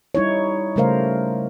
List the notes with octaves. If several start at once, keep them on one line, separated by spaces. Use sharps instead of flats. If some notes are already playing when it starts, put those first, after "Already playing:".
G3 D#4 E4 C#5
C#3 G3 A3 A#4 C5 F5